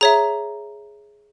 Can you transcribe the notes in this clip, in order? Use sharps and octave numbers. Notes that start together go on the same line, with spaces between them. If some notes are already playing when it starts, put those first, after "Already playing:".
G#4 C#5 E5 A#5